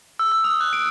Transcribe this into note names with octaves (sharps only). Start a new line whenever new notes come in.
E6
E6
D#6
F#6
D7